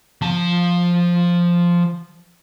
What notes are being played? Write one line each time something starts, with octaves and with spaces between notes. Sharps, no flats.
F3 A5